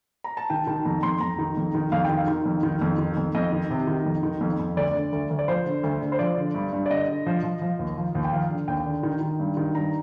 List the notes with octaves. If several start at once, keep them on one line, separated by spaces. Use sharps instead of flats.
A#5
A5
D#3 G5
D#3 A5
F2 A#5
F2 C6
F2 A#5
D#3
F2
D#3
F2 F5
D#3 G5
F5
D#3
F2
D#3
F2
D#3
F2
F2 D#5
D#3
C3
D#3
F2
D#3
F2
F2
D2 D5
D3
D2
D2
D5
F3 C5
D3
D2
D3
C5
F3 D5
D3
G2
G2
D5
D3 D#5
D3
F3
F3
F3
D#2
F3
D#2
G5
F3 F5
D3
D#2 G5
D3
D#3
D#3
G2
D#3
G2 A#5